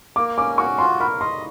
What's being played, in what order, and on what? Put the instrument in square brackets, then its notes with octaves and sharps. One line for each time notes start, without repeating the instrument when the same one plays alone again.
[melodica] A#3 [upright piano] D6
[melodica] C#4 [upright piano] D6
[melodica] F#4 [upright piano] C#6
[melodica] F4 [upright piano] C6
[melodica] A#4 [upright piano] B5
[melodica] D#5 [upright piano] C6